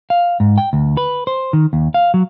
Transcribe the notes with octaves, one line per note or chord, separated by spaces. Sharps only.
F5
G#2
G5
D2
B4
C5
D#3
D#2
F5
F#3